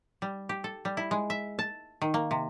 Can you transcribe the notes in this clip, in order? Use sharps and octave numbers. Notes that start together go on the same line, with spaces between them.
G3
G4
A4
G3
E4
G#3
E5
A5
D#3
A#3
C3